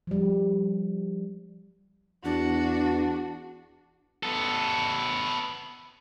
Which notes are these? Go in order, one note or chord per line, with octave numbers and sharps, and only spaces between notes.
F3 G3
E2 D4 F#4
B3 A4